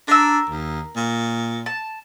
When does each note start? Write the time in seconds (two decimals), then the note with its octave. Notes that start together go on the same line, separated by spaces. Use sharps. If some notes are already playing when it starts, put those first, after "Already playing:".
0.08 D4 A#4 E6
0.50 D#2
0.96 A#2
1.66 A5